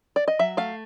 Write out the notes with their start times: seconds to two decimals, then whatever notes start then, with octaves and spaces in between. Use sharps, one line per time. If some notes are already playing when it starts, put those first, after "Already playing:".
0.16 D5
0.28 D#5
0.39 F#3 E5
0.57 A3 F5